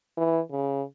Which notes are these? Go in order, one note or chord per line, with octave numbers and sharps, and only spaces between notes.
E3
C#3